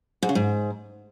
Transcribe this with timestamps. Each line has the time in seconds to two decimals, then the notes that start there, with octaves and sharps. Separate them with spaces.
0.22 G#2
0.29 C#3
0.35 G#2